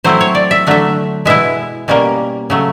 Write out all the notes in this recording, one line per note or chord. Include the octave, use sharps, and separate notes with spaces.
F#3 A3 C4 E4 C5
C#5
D5
E5
D3 F#3 A3 D4 E5
B2 G#3 B3 E4 E5
B2 G3 A#3 C#4
C#3 F#3 A3